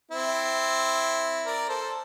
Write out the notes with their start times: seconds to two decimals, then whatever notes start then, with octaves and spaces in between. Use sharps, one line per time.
0.11 C4 E4
1.46 A#4 D5
1.69 A4 C5